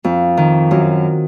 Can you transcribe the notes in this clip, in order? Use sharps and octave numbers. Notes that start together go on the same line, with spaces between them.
F2
D#3
F#2